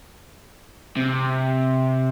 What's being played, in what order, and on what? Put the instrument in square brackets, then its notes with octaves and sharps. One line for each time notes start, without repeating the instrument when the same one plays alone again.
[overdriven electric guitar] C3